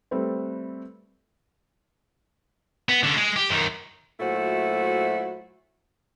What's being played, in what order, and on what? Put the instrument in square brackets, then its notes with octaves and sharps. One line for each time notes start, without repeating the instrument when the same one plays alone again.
[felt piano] G3 A3 C4 A4 B4 C5
[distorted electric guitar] B3
D3 C#4
G#3
G4
F#2 D#3
[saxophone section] A#2 F#3 A3 E4 F#4 C5